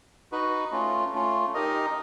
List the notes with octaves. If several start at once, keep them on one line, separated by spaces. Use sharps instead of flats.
D#4 F#4 B4
A3 C#4 F4
A3 C#4 F4
D#4 G4 A#4 D#5